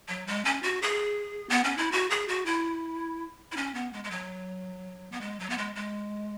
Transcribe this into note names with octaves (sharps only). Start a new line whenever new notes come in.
F#3
G#3
C#4
F#4
G#4
B3
C#4
E4
F#4
G#4
F#4
E4
E4
C#4
B3
G#3
G#3
F#3
B3
G#3
F#3
B3
G#3
G#3